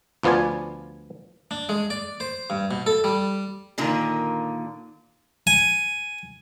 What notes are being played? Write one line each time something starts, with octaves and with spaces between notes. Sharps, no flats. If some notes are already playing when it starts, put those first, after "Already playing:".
D2 F3 B3 F4 D5 G#5
D4
G#3
D5
C5
G2
B2
A4
G3
A#2 D3 D#3 A#3
G#5